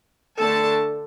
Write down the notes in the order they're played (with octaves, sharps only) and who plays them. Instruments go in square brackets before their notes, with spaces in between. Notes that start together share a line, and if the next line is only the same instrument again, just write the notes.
[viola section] D3 A3 D4 A4 A5